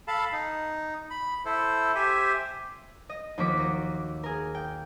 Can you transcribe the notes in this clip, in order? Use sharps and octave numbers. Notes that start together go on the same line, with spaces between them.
A4 F5 A5 B5
D#4
B5
E4 A4 C5
G4 C5 E5 G#5
D#5
D#2 F3 A#3 F#4 D6 B6
F#4 D#5
G#4 A#4
G5